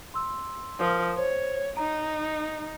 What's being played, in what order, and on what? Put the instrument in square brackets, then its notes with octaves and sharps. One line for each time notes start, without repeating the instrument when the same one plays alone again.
[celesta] C6 E6
[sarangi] F3 [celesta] A#4 D#6
[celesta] C5 [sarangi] C#5
[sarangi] D#4 [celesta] A#5